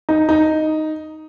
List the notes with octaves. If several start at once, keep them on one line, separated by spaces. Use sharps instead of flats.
D#4
D#4